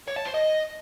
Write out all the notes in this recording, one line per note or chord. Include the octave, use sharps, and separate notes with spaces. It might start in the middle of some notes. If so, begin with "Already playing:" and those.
C#5
A5
C5
D#5